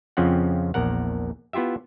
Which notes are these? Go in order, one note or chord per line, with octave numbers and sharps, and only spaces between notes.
F2 C#3 F3 C4 C#4 F#5
A#1 E2 A#4 F#5
B3 E4 F4 G4 E5